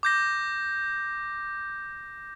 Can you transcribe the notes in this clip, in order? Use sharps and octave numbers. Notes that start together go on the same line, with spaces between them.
D6 G6 A#6